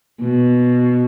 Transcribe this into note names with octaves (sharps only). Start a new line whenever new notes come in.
B2